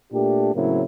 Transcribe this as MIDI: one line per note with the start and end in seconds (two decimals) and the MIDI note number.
0.13 0.50 46
0.13 0.50 57
0.13 0.50 62
0.13 0.50 67
0.54 0.83 45
0.54 0.83 49
0.54 0.83 54
0.54 0.83 58
0.54 0.83 60
0.54 0.83 64